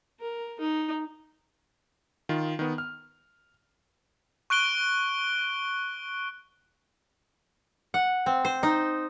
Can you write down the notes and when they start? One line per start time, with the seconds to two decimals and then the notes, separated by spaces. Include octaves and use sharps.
0.20 A#4
0.60 D#4
2.29 D#3 F4
2.59 D#3 B3
2.78 F6
4.50 C#6 F#6 D7 G7
7.94 F#5
8.26 C4
8.45 C5
8.63 D#4